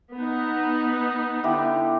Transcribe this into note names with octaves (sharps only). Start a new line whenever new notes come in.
B3 D#4
D3 E4 G4